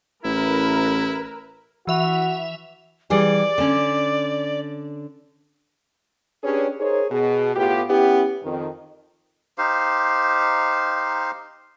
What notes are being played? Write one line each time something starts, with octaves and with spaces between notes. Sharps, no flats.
A1 E4 A#4 B4
E3 F#4 E5 F7
E3 G3 G#4 D5
D3 C#4
C#4 D4 G4 G#4 B4 C#5
D#4 G#4 A#4 C5 C#5
B2 G#4
A2 B3 F4 G4
B3 C#4 E4 G4
F2 D#3
D#4 G4 C5 F5